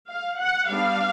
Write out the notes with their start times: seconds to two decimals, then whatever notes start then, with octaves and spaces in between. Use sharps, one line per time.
0.09 F5
0.39 F#5
0.67 G3 B3 D4 F5